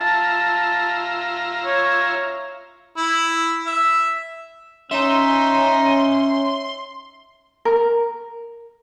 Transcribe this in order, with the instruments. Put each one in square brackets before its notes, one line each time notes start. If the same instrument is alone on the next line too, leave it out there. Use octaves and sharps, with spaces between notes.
[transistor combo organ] F4 E5 A#5 [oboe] A5
[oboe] C#5
[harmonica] E4
E5
[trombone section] C#4 [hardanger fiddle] D#4 [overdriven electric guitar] E5 [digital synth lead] C6
[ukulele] A#4